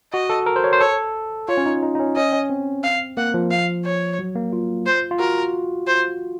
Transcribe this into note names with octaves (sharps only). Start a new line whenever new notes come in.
F#4 D#5
A4
A#4
C5
C#5
C5
A4 C#5
F4 C#5
C#4
D#4
D#4
D#4
C#4
C#4 D#5
C#4
C4
F5
A#3 F#5
F3
F5
C#5
F#3
A#3
F4
C5
F4
F#4 A#4
C5